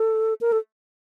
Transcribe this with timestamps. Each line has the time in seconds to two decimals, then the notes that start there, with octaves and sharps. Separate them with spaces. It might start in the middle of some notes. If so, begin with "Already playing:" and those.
Already playing: A4
0.41 A#4
0.52 A4